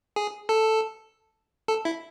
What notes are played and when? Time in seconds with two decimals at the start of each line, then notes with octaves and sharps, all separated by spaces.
0.16 G#4
0.49 A4
1.68 A4
1.85 E4